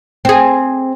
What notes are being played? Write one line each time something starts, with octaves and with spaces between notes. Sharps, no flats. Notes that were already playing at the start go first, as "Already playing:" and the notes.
C4 G#4